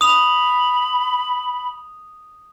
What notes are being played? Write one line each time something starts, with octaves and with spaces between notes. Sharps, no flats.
B5 D#6 F7